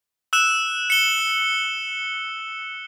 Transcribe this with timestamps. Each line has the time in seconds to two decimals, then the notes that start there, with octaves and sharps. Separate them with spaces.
0.33 E6 F#6 E7
0.90 C#7 G7